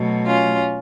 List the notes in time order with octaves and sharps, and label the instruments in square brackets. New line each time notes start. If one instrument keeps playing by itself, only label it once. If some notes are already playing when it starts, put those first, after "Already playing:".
Already playing: [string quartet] B2 F#3 A3
C#4 F4